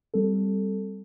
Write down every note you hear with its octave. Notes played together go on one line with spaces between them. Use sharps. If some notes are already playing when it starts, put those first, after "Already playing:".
G3 C4 A4